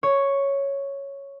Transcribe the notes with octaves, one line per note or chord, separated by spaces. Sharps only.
C#5